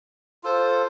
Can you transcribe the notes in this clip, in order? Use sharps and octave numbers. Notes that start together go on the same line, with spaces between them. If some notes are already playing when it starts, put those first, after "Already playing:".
F4 A4 C5